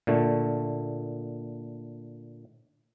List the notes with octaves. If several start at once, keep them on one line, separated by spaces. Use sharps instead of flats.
A#2 D3 A3